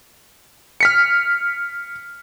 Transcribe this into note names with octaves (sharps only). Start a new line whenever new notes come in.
F6 B6 C#7